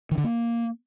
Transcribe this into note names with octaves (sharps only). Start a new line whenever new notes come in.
D#3
D3
A#3